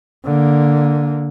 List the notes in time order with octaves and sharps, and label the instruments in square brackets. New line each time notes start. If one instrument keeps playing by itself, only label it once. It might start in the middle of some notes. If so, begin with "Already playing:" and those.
[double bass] D3 A#3